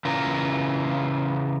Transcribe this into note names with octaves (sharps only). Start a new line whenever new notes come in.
C#3 E3 F4 A#4